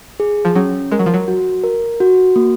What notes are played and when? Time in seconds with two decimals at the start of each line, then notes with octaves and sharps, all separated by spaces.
0.20 G#4
0.45 F3
0.55 F#3 C#4
0.92 G#3 A#4
0.99 F#3
1.06 F3
1.14 F#3
1.28 F#4
1.64 A#4
2.00 F#4
2.36 A#3